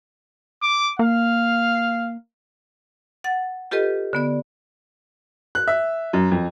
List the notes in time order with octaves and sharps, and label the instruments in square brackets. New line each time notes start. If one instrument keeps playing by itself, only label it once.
[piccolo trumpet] D6
[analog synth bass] A#3 [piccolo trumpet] F5
[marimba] F#5 A6
F4 G4 A4 B4 D#5
D3 B3 D5
[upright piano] F#6
E5
F#2
F2